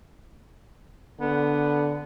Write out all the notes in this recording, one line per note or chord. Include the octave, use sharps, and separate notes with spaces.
D3 B3